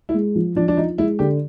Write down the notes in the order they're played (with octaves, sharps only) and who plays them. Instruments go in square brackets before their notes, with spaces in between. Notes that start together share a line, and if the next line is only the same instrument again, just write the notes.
[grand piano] E4
[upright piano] G#3
F3
[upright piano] F3 [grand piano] D4
[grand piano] D4
[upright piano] F3 [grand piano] D#4
[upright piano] G#3 [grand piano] E4
[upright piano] D3 [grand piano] G4